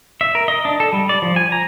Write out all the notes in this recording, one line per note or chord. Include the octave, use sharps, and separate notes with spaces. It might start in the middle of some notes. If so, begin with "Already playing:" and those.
E5
A#4
D#5
D4
A4
G3
D5
F3
G#5
A#5